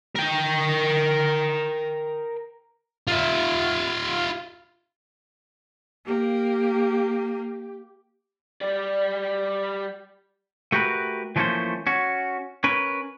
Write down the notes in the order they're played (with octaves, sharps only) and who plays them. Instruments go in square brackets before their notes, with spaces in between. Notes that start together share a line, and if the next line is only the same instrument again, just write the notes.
[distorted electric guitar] A#4 G5
F4 E5
[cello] A#3 [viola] G4
[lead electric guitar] G3 D5
[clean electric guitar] A3 F#4 G4 A#4 B4
E3 F3 A3 A#3 C#4 C5
C#4 F#4
C#4 A#4 B4